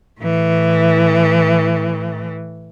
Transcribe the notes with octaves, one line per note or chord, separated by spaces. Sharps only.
A2 E3